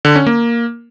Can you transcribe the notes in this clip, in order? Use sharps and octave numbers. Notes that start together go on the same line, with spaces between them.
D3
C#4
A#3